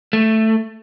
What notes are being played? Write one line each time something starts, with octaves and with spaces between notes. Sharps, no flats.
A3